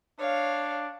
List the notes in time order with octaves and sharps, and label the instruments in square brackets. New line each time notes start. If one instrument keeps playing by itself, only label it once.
[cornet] D4 [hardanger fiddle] C#5 F5